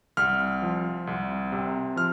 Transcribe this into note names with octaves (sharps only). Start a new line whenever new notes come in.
C2 F6
F3
C2
C3
F3 F6